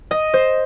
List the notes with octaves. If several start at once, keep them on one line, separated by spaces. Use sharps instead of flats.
D#5
C5